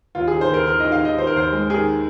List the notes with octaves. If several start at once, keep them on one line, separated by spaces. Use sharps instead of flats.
D#2 F4
G#4
D#3
C5
D#2 A#4
D#3 A#4
D#3 D#5
F5
D#3 D#5
D#3 C5
A#4
D#2 C5
G#3
D#3 G#4